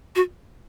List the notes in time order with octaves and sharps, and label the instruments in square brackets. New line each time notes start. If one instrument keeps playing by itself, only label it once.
[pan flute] F#4